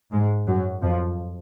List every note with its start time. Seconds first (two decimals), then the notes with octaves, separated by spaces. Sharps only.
0.12 G#2 G#3
0.47 F#2 F#3
0.82 F2 F3